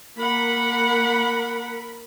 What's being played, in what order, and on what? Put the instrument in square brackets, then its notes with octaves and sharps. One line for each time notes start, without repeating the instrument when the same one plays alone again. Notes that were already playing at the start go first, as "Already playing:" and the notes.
[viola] A#3 F#5 [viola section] A#4 B5